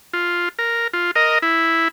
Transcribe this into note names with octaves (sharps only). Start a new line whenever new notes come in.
F4
A#4
F4
A#4 D#5
E4